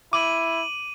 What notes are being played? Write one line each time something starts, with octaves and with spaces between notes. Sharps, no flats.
E4 D6 D#7 F#7